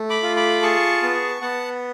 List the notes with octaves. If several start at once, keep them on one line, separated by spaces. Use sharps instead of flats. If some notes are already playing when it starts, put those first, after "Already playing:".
Already playing: A3
B5 D6
F4
B5 D6
G#4 A5 C#6
B3
B3 F#5 A5